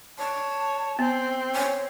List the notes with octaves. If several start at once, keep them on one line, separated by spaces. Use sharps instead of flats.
C#5 A5
B3 C4
C#5 G#5